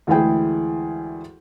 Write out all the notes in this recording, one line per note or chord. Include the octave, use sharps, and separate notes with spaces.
D2 E3 G#3 E4 G#4 G5